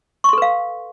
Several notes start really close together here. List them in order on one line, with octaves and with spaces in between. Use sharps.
C#6 C6 A4 B4 F5